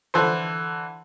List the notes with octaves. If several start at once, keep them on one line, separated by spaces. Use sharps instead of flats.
D3 E3 A4 C5